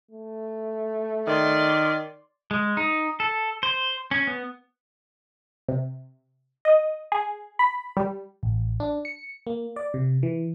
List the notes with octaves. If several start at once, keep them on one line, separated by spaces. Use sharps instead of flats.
A3
D#3 D5 C6
G#3
D#4
A4
C5
C#4
B3
C3
D#5
G#4
B5
G3
A1
D4
C#7
A#3
D5
C3
E3